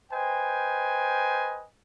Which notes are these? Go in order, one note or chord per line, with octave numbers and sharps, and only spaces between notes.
B4 C5 D#5 G5 G#5